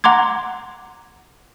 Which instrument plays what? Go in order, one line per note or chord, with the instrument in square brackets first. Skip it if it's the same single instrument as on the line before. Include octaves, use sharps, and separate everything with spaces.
[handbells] F#5 A#5 C6 D6 G#6